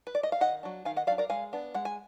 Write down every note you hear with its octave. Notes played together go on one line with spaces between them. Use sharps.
B4
D5
D#5
F5
D#3 D#5 F#5
F#3 D4
D#3 F5 G#5
D#5 F#5
F#3 D4 D5 F5
A#4 D5
G#3 F5 G#5
B3 D4
G#3 F#5
G#5